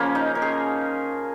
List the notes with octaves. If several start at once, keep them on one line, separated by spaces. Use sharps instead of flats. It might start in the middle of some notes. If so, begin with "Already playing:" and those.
Already playing: C#3 F3 A#3 C#4
D#4
A#4
G#4